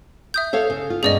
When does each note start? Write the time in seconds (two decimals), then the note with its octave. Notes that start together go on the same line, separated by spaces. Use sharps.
0.34 E5 D#6 G6
0.53 A4 C#5 F5
0.70 C#3
0.90 F4
1.03 G2 B2 C#4 G#4 D5 D#5